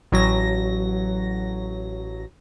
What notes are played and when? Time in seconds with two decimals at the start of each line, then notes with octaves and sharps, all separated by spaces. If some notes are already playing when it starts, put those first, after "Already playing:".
0.12 A1 F#3 A#6